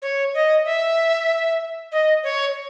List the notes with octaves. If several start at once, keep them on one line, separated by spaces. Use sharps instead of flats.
C#5
D#5
E5
D#5
C#5